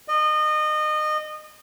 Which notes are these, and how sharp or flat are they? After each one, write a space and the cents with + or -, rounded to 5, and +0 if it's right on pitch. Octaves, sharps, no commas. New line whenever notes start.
D#5 -30